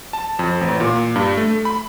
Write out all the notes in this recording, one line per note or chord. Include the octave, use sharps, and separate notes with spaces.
A5
F2
A1
A#2
G2
A3
B5